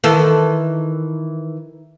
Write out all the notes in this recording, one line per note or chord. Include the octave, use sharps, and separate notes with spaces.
D#3 E3 A4